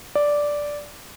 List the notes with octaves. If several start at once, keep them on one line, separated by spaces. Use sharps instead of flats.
D5